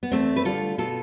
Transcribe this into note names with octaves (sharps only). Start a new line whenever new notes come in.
B3
E2 A3 C4
B4
D3 G3 F4 A4
B2 F4 A4